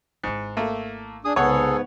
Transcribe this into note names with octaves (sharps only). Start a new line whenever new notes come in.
G#1 G#2 E4
A3 A#3
D4 G#4 D#6
C2 G#2 C#3 B3 G#4 A4 C#5 F#5